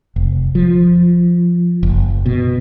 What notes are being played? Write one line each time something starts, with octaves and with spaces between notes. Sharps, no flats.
F1
F3
F#1
B2